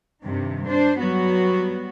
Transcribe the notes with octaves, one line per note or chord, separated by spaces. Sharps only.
G2 C3 D#3
D4 C5
F#3 G3 B3 F#4